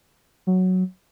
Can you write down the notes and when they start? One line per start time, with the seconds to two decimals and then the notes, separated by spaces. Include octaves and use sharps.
0.47 F#3